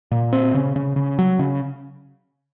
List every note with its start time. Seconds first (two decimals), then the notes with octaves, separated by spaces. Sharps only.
0.11 A#2
0.33 C4
0.54 C#3
0.76 C#3
0.96 C#3
1.19 F#3
1.39 C#3